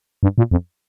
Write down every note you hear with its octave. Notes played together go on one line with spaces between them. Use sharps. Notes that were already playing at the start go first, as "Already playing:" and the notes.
G2
A#2
F2